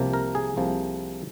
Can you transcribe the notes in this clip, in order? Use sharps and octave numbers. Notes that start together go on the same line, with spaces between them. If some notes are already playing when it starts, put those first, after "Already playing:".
Already playing: C2 C3 F3 A#3
A#4
G#4
C2 C3 F3 A#3